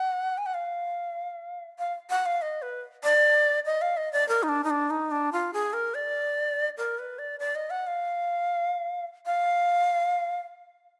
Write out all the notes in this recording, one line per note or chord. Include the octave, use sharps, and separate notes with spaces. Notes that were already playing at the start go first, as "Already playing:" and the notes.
Already playing: F#5
G#5
F#5
F5
F5
F#5
F5
D#5
B4
D5
D#5
F5
D#5
D5
A#4
D#4
D4
D#4
D4
D#4
D4
F4
G#4
A#4
D5
A#4
B4
D5
D5
D#5
F#5
F5
F5